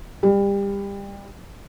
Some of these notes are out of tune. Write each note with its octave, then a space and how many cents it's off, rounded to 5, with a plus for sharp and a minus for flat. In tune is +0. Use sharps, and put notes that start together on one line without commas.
G3 +25